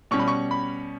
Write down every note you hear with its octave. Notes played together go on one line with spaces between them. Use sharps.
B2 G3 C#4 C#6
B5
C#6
B5